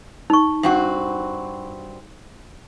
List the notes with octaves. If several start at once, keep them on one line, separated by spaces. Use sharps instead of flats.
D#4 C#6
G2 C4 F#4